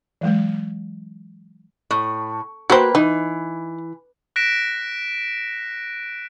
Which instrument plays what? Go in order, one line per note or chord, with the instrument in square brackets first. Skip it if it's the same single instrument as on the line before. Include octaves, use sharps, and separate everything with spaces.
[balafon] E3 F#3 G#3
[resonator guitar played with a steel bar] A2
[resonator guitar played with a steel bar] A#3 B4 G5 [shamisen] F#4 C5
[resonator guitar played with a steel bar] E3 [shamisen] D#4
[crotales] F#6 A#6 B6 D7 E7